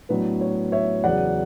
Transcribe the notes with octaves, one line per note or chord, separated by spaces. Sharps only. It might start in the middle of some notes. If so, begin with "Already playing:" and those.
A2 F#3 B3 D4 B4
C#5
C#5 E5
E2 C#3 F#3 D5 F#5